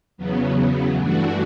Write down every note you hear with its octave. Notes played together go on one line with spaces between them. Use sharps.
E2 C#3 F#3 B3
G2 E3 A3 D4 F#4